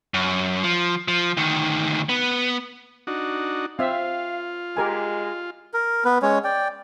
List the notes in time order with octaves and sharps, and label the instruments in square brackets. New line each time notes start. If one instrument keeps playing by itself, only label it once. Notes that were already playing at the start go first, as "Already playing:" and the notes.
[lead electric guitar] F#2
F3
F3
D2 D#3
B3
[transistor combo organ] D4 D#4 F#4
[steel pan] C4 E5 [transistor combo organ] F4 [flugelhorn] F5
[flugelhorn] G#3 [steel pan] G4 A#4 G#5
[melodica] A#4
B3 B4
G#3 C#4 C#5
D5 G5